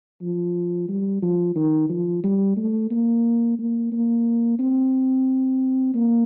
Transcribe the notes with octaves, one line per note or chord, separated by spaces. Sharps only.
F3
G3
F3
D#3
F3
G3
A3
A#3
A#3
A#3
C4
A#3